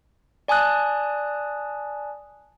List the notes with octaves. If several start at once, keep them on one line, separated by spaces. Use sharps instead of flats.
D5 G#5 A5 D#6 F#6